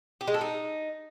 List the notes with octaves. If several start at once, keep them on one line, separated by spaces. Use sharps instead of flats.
G4
G#3
A4
D#4